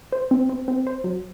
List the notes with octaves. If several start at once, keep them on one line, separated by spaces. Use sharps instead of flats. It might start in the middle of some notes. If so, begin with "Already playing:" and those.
C5
C4
C4
C4
C5
F#3